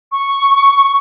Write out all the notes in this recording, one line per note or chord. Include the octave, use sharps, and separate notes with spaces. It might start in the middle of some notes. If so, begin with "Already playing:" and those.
C#6